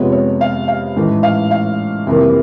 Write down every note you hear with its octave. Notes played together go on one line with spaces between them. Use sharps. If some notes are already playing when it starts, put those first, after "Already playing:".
Already playing: F2 C3 F3 G#3 B3 C#5
C#5
F5
F5
A1 G#2 E3 A3
F5
F5
F2 C3 E3 G3 A#3